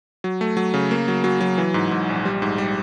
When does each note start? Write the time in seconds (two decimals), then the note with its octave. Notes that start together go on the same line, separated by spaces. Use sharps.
0.24 F#3
0.41 A3
0.57 F#3
0.74 C#3
0.91 A#3
1.08 F#3
1.24 F#3
1.41 F#3
1.58 E3
1.74 G#2
1.91 G#2
2.09 A#1
2.25 G3
2.42 G#2
2.58 G3